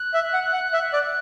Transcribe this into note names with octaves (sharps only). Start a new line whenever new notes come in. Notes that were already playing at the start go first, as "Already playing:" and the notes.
Already playing: F#6
E5
F#5
F#5
E5
D5